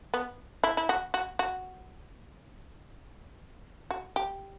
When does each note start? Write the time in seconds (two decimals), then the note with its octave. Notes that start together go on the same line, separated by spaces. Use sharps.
0.14 B3
0.64 E4
0.77 E4
0.89 F#4
1.14 F#4
1.39 F#4
3.91 F#4
4.16 G4